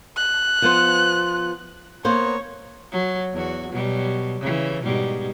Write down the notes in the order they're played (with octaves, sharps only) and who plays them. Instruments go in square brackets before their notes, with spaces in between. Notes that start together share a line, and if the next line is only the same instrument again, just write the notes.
[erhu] F#6
[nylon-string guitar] F3 B3 C5
[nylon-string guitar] A#3 B3 C5 [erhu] C#5
[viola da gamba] F#3
E2 F#4
B2 F#3 G3
C#3 E3
G#2 B2 G3